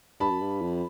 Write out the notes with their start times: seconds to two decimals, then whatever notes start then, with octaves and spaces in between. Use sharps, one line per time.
0.20 G2 A5 B5
0.30 F#2
0.41 G2
0.62 F2